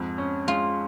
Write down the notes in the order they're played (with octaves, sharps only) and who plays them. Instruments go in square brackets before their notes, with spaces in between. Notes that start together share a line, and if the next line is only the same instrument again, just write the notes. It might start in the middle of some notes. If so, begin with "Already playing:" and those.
Already playing: [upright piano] F2 G#2
C#4
[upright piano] G#3 [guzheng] F4